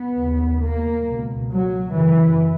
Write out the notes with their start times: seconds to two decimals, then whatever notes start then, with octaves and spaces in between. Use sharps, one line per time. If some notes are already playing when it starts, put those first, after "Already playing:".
Already playing: B3
0.19 D#2 C#3
0.63 A#3
1.07 C#2 B2
1.51 F#3
1.94 F#2 C#3 E3